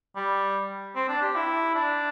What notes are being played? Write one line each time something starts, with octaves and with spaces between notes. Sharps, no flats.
G3
C4
D4
G4
E4
D4